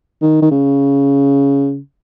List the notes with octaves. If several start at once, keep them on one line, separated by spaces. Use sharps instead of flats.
D#3
D#3
C#3